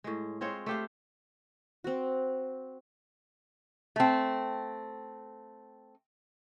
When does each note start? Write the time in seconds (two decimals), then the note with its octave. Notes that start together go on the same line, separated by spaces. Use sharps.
0.04 A2 G#3
0.41 G#3 C4 F4 C#5
0.66 A3 G4 F5
1.84 C4 F#4
3.96 A3 C4